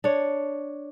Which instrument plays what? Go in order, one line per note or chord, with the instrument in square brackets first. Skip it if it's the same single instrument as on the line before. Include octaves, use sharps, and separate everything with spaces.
[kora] D4 C#5